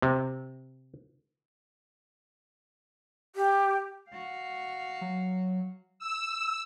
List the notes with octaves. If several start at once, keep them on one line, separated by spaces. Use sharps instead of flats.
C3
G4
F#4 F5
F#3
E6